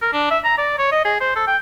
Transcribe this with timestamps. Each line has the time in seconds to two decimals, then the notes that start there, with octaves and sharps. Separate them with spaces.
0.02 A#4
0.13 D4
0.31 E5
0.44 A#5
0.58 D5
0.79 C#5
0.92 D#5
1.05 G#4
1.21 C5
1.36 A4
1.47 G5